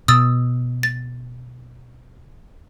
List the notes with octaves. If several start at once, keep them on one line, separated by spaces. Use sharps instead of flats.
B2 D#6 E6 A6
A6